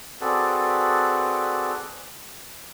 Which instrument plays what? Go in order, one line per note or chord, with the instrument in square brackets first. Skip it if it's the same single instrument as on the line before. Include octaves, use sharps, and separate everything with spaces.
[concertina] C4 F#4 G#4 A4 B4 D5